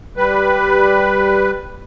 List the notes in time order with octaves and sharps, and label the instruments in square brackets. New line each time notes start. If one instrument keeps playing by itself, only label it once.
[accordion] G3 B4